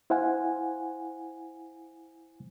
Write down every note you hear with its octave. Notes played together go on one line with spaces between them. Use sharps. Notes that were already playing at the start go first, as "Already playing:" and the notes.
E4 C5 F5 F#5 G#5